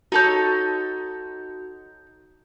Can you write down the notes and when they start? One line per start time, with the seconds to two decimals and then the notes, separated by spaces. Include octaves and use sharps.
0.12 D#4 F#4 A4 C#5 G6